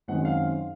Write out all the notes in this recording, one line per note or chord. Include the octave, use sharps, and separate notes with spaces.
F#2 D#3 G#3 C4 F#5
F5